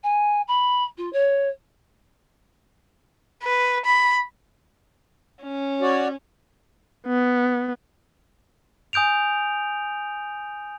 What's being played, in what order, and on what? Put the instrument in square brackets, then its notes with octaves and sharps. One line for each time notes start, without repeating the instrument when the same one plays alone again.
[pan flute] G#5
B5
F4
C#5
[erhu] B4
B5
[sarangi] C#4
[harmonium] F#4 C#5 D5
[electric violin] B3
[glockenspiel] G#5 D#6 G6 D7 F7